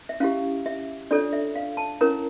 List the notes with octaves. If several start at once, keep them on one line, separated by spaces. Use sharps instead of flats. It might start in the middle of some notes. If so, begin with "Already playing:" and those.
E5
C#4 E4 G4 F5
E5
D4 F4 A4 C#5 D5
E5
F5
A5
C#4 E4 A#4 C#5 A#5